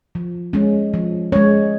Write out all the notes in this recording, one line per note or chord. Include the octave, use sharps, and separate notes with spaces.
F3
G#3 C#4
F3
G#3 C#4 C#5